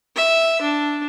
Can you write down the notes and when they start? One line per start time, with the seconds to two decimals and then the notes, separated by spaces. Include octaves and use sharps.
0.16 E5
0.61 D4